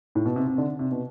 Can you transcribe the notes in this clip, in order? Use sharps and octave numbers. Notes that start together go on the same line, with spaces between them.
A2
B2
C3
C3
D3
C3
B2